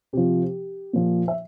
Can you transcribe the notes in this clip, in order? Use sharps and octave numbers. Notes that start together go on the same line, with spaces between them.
C3 F3 G4
A#2 F3
E5